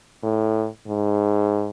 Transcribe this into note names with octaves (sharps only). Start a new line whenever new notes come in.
A2
G#2